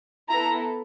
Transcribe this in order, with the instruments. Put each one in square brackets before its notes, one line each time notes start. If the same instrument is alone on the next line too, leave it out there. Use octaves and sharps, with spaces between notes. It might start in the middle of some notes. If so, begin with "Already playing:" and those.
[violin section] B3 E4 A4 A#5